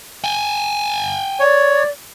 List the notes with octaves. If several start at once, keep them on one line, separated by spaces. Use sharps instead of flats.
G5 G#5
C#5 D5